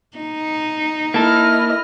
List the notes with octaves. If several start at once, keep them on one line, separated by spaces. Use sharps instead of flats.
D#4
A#3 E4 A4 D#5 F6